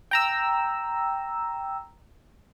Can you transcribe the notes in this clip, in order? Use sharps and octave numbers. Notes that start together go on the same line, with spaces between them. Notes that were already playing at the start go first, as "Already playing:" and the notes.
G5 A#5 E6